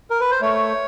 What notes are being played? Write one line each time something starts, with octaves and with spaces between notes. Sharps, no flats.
A#4
B4
C5
A3 C#5